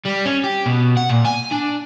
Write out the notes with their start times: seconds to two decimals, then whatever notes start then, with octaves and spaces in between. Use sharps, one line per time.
0.05 G3
0.25 C#4
0.44 G4
0.66 B2
0.97 F#5
1.09 A#2
1.25 G#5
1.52 D4